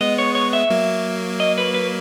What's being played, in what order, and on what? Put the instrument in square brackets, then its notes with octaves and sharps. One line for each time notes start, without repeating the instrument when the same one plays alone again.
[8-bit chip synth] G#3 B3 [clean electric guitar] D#5
[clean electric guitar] C#5
C#5
E5
[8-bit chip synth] F#3 A#3
[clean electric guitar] D#5
B4
B4